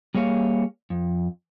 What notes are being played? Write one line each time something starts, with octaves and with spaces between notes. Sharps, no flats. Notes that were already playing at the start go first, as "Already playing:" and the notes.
G3 A#3 G#4 C#5 F5
F2